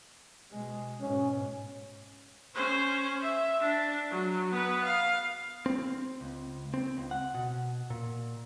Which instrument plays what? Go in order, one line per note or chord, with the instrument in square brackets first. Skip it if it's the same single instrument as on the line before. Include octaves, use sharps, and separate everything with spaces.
[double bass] B2 G#3
[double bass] G#2 B2 [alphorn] C#4
[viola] C#4 C5
E5
D4
F#3
B3 B4
F5
[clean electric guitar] C4
C#2
C4
C#2
F#5
B2
A#2